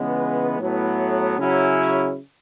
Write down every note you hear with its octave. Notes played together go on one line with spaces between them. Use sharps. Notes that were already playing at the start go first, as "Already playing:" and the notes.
Already playing: C#2 C#3 E3 G#3 B3
A2 F#3 B3
C#3 F#3 C#4 E4